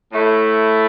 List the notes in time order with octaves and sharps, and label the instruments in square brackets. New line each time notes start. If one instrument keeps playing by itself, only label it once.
[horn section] A2 A3 E4